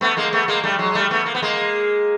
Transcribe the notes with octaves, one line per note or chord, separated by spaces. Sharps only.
A3 B3
G#3 A#3
A3 B3
G#3 A#3
G3 A3
F#3 G#3
G#3
G3 A3
A3 B3
A#3
B3
G#3 A#3